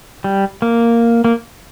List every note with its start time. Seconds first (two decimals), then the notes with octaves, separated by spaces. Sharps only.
0.24 G3
0.62 A#3
1.24 A#3